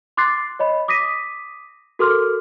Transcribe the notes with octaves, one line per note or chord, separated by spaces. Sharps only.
C6 D6 F#6 A6 C7
C#5 D#5 B5
D6 D#6 A#6 B6 D#7
F#4 A4 A#4 C6 D6 F6